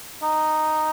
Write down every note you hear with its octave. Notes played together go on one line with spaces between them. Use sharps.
D#4